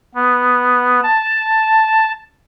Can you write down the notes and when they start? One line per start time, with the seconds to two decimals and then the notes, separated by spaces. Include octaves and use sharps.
0.15 B3
1.03 A5